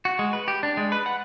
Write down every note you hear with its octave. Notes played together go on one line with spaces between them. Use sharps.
F#4
G#3
B4
G4
D4
G#3
B4
F#5